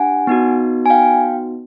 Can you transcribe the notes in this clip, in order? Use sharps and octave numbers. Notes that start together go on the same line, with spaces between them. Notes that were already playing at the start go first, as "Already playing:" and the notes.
Already playing: D4 G4 F#5 G#5
B3 D#4 F#4
G#5
F5 G5